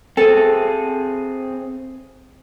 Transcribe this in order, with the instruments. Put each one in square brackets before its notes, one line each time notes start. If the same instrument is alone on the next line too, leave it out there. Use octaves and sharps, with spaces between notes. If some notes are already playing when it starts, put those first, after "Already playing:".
[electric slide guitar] C4 G#4 [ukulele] A4